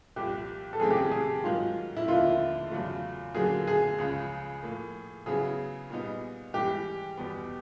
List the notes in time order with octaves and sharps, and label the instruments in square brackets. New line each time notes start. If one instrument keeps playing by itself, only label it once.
[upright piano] C2 A#2 F3 [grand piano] G4
[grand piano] A4
[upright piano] F#2 C#3 E3 A3 C4 [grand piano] G#4
[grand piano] G4
G#4
G#4
[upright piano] G#2 D#3 F#3 [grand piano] F4
[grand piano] E4
[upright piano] D#2 D3 F3 A#3 D#4 [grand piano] F4
[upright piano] E2 C#3 F#3 A3
[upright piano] F#2 D3 F#3 A#3 [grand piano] G#4
[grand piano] G#4
[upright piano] C#2 C#3 F3
A2 F3 A#3
[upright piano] C#3 F#3 B3 E4 [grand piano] G#4
[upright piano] A#2 G3 B3 D#4
[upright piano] G#2 E3 G3 [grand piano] G4
[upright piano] E2 B2 G3 B3